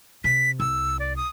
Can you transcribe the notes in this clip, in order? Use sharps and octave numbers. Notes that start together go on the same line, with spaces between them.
C3 B6
C2 E6
D5
D#6